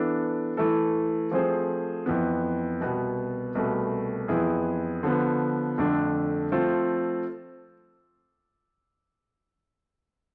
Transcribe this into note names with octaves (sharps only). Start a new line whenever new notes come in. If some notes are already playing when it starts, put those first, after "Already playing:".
Already playing: E3 B3 D4 A4
E3 A3 E4 A4
F3 A3 C4 G#4 C5
F2 E3 B3
C2 B2 B3
C2 B2 A3
F2 E3 B3 E4 G#4
D3 F3 B3
F2 D3 A3 D4
F3 A3 C4 F4 A4